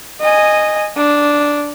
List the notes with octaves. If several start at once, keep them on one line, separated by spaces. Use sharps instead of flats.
D#5 G#5
D4